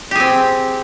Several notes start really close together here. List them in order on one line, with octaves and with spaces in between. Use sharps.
G4 G#4 C4